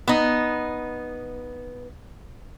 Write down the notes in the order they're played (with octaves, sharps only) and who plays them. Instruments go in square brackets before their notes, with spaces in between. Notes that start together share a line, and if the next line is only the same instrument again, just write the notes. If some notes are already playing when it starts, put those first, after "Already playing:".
[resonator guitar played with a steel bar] B3 D#4